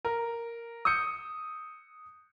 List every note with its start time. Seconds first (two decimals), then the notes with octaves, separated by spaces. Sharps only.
0.05 A#4
0.85 D#6 E6 G6 C#7